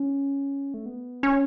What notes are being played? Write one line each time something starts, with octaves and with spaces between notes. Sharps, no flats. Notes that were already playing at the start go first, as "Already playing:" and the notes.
Already playing: C#4
A3
B3
C#4